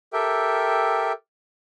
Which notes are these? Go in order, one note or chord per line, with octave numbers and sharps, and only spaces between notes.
G4 A4 A#4 E5 G5